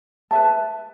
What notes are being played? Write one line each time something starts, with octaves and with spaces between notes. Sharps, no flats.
B4 E5 A5